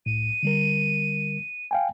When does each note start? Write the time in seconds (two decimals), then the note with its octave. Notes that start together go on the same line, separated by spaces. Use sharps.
0.06 C2 A2 D#7
0.43 D3 G3 A#4
1.71 F5 G5 G#5